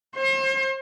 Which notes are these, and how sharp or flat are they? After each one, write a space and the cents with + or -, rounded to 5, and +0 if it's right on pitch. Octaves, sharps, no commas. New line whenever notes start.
C5 +40 C6 +45